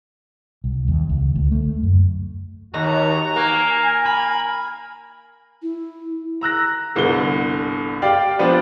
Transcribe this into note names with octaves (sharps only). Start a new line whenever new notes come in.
C2
D#2
C#2
D2
A3
F#2
D#2 F#4 A#5
A#3 A#4 G#5
B5
E4
A#5 E6 F#6 A#6
G1 C2 D3 B3 G7
G4 D5 F5 G5
F3 B3 C4 D4 F4 B4